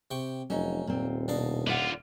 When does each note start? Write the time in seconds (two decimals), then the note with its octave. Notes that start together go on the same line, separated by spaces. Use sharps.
0.11 C3 G5 C#6
0.50 F1 F#3 C#4 D#4
0.87 D#1 A#2 C4
1.28 B2 D4 D#4 F5
1.67 D3 F4 E5 F#5